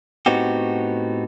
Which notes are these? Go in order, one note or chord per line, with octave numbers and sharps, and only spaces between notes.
A2 B3 C4 D#4 F#4 G4